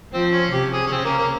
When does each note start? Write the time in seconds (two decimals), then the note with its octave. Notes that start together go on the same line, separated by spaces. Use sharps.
0.13 F3 C4
0.33 C#4
0.52 C3 G4
0.73 G#4
0.87 C#4
0.92 C#3 C4
1.05 A#3
1.18 A#3